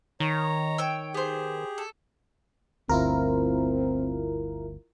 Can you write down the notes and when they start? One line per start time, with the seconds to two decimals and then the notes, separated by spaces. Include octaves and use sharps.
0.20 D#3 C#5 A#5
0.78 C#5 G5 E6
1.14 B3 G4 G#4 C5
1.78 A4
2.89 G1 D2 C4 E4 F4 A#4